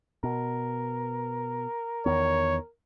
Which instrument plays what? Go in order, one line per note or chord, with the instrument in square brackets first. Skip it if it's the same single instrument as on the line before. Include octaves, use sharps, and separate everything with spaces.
[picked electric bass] B2 [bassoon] A#4
[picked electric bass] E2 D#3 B3 [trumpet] C#5